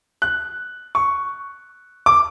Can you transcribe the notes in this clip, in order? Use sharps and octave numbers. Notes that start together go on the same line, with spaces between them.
F#6
C#6
D6